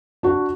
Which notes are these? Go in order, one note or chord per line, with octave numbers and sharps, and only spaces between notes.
D4 F#4